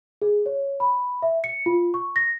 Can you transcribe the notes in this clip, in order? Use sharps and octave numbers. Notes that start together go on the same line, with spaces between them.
G#4
C#5
B5
E5
C#7
F4
C#6
A#6